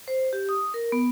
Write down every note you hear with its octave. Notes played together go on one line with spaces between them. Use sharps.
C5
G4
D#6
A#4
B3